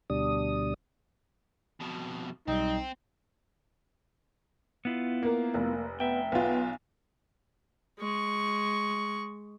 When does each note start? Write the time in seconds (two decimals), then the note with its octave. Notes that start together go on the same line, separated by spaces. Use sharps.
0.10 D2 B2 G3 D4 D#6
1.80 F2 B2
2.48 B1 G3 C4 D#4
4.85 B3 E4 F4
5.23 A#3 A#4
5.54 F1 A#3
6.00 B3 E5 G5
6.32 B1 B3 F4
7.99 G#3 C#6